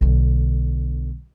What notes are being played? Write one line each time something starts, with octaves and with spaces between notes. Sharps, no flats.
B1 D3